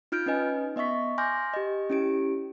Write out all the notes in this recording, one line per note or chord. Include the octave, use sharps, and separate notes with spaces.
D#4 F4 F6 G6 D7
C#4 D#4 B4 D#5 G#5
B3 D#5 E5 C#6 B6
G#5 C6 D6 F6 G6 A#6
G4 D#5
C#4 E4 G4 D7